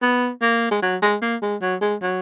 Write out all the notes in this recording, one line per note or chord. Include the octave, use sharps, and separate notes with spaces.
B3
A#3
G#3
F#3
G#3
A#3
G#3
F#3
G#3
F#3